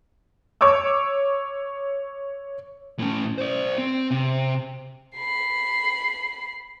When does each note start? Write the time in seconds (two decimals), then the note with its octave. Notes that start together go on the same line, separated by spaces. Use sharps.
0.61 C#5 C#6 D6 E6
2.99 A2 C#4
3.38 C5 D5
3.78 C4
4.11 C3
5.16 B5 C7